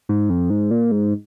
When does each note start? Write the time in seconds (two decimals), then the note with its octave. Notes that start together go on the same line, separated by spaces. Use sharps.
0.09 G#2
0.30 F2
0.50 G#2
0.71 A#2
0.92 G#2